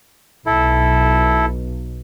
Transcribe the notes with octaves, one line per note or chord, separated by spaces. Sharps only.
B1 E4 A4